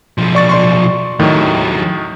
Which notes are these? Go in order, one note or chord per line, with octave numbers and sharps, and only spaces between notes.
B1 F3
D5 C#6 A6
D5 C6 C#6
D#2 A2 D#3 F#3